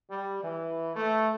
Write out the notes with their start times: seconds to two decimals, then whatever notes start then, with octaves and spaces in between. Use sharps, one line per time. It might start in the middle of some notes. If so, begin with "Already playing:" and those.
0.11 G3
0.43 E3
0.96 A3